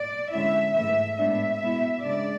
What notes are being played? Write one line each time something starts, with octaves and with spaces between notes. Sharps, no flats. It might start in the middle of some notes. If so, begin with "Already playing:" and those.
Already playing: D5
D3 G#3 C#4 E4 E5
G#2 E3 A3 E5
A2 G#3 B3 D4 E5
B2 G#3 B3 E4
C#3 G#3 D4 D5